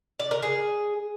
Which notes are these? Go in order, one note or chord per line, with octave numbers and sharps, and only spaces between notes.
D5
A#4
G#4